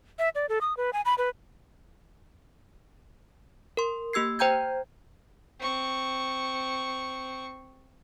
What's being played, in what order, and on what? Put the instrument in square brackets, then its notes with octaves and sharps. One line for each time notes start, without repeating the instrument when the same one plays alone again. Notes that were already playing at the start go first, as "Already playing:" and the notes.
[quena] E5
D5
A4
D#6
B4
G#5
B5
B4
[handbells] A#4 C6
A#3 G4 E6 G#6 C7
C5 G5 A#5 G6 G#6
[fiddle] C4 C#6